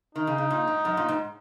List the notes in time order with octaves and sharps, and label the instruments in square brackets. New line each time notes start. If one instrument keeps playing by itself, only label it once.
[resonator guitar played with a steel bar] D#3 [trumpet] D#4
[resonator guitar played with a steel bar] C#3
C#3
A#2
G#2
F#2
A#2
G#2